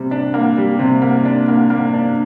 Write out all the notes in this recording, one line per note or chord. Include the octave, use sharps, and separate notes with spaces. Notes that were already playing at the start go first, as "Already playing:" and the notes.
Already playing: C3 G3
D4
A#3
G3
C3
A#3
D4
A#3
A#3
D4